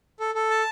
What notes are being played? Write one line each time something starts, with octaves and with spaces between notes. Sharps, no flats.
A4
A4
A5